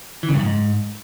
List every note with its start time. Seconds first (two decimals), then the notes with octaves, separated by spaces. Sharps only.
0.23 E3
0.28 C#3
0.34 G2
0.39 F#2
0.45 G#2